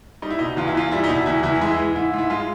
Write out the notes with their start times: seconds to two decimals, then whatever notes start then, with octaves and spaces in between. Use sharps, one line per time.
0.22 G3 D#4
0.30 E4
0.39 B2 D#4
0.57 E2 F4
0.67 E4
0.75 E2 F4
0.91 G3 E4
1.04 D#4
1.09 B2 E4
1.26 E2 E4
1.43 E2 E4
1.61 G#3 E4
1.79 E3
1.96 G#2 E4
2.13 G#2 E4
2.30 G#3 F4